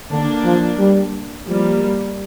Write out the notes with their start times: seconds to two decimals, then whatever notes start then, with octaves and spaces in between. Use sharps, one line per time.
0.09 D3 A#3 D4
0.45 F3
0.78 G3
1.47 F3 G3 A#3